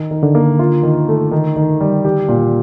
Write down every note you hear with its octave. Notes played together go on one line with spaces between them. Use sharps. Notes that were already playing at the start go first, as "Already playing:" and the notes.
Already playing: D#3
D#3
D3
A#3
F4
D#3
A3
D#3
D#3
G3
D#3 G4
A#2